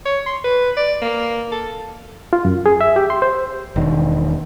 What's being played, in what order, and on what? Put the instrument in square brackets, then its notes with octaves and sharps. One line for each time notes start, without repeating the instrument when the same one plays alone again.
[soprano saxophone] C#5
C6
B4
D5
A#3
A4
[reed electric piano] F4
F#2
G#4
E5
G4
C6
C5
[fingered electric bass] E1 D#3